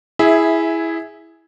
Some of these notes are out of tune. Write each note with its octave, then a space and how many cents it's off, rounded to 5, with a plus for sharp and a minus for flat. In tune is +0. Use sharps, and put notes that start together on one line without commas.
E4 +0 G#4 +0 E5 -15